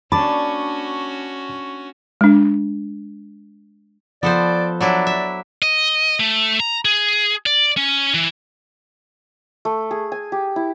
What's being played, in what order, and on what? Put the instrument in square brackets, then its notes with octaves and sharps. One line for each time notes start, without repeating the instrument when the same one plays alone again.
[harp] A#3 D4 [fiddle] C#4 F#4 [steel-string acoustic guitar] A5 [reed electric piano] B5 D6
[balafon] G#3 D4
[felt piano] F3 [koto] B3 A4 C5 [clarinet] D5
[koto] F#3 D4 E4 [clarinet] D5
[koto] E5
[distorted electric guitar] D#5
A3
A#5
G#4
D5
C#4
E3
[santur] A3
G#4
G#5
G4
E4